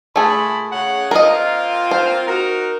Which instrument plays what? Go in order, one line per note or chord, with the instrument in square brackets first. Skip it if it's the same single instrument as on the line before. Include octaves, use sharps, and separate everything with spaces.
[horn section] A#2 A5 B5 [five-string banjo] A3 G#4
[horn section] C#3 F#5
[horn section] A#3 C4 F4 [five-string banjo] A#4 D#5
[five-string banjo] C5
[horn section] D#4 F#4 A#4